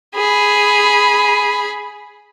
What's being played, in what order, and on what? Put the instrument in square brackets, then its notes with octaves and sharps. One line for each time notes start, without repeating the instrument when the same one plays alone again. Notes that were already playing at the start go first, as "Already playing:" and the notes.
[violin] G#4 B5